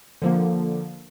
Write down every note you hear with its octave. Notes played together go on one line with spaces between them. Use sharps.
D3 F3 A#3